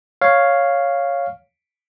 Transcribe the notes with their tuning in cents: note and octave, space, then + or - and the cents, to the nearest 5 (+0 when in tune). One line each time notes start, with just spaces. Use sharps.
C#5 +0 F5 +0